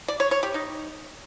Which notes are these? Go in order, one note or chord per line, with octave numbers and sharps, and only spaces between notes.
D5
C#5
C#5
G4
D#4